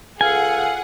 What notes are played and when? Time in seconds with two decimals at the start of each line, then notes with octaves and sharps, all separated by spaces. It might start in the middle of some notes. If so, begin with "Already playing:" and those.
0.21 C#2 G#4 A4 F5 F#5 G#5